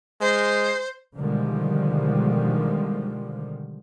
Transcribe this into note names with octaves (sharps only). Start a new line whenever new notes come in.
G#3 C5
B2 D3 D#3 F3 G3 G#3